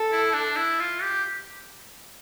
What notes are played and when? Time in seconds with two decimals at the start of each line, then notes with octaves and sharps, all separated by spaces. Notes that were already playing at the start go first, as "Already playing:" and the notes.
Already playing: A4
0.12 E4
0.34 D4
0.57 E4
0.80 F4
1.02 G4